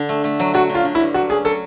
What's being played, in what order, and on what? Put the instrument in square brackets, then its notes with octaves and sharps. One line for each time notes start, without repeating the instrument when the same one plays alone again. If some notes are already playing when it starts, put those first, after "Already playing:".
Already playing: [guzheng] D3
A3
A3
F#3
[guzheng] F#3 [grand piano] F#4
[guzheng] D3
[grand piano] F4
[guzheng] D3
[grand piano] E4
[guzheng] G2
[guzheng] F#3 [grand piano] F#4
[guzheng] C#4 [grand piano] G#4
[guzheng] F#3 [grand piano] A4